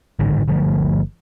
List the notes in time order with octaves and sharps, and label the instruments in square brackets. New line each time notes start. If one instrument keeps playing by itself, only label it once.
[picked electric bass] A1 G#2 D3 D#3
G1 D3 F3 A3